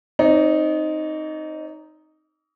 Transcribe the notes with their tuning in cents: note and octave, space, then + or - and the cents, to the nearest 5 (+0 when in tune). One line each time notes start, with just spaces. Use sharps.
C4 +15 D#4 +0 D5 -45